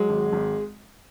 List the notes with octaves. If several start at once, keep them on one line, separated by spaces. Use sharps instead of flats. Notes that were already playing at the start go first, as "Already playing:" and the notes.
Already playing: F#3 G#3
G#1
G#1